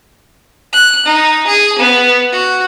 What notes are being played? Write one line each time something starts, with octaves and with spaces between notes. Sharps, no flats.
F#6
D#4
G#4
B3
F#4